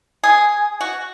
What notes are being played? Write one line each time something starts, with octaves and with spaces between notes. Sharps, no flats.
G#4
F#4